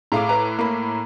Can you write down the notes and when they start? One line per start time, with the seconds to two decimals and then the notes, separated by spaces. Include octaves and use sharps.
0.12 A2 G#4 F5 A#5 D6
0.29 B4 A#5
0.59 A#3 B5